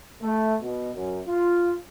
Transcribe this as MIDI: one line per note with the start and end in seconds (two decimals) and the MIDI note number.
0.22 0.55 57
0.62 0.90 47
0.95 1.20 42
1.28 1.73 65